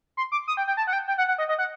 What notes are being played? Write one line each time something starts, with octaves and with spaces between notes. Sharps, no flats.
C6
D6
D#6
G5
G5
A5
F#5
G5
G5
F#5
F#5
D#5
D#5
F#5